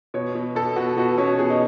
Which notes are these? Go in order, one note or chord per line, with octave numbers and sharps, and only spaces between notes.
B2 C#5
B2
B2 A4
B2 F#4
B2 F#4
B2 C#4
B2 G#4
D#4